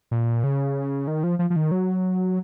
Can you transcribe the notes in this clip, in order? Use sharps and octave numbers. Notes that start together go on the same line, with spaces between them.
A#2
C#3
D#3
F3
F3
F3
D#3
F#3